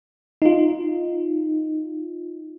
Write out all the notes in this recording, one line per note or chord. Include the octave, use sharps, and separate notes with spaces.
D#4 F4